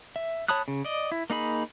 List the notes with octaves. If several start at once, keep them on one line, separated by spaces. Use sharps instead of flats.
E5
C#5 A5 B5 D#6 F#6
C#3
D5 D#5
E4
A#3 D#4 G#4 B5